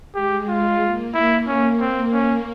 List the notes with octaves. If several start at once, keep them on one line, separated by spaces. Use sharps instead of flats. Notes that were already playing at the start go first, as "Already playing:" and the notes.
G#3 G4
G#3 F4
A#3
E4
A#3 C#4
A#3 C4
A#3 C#4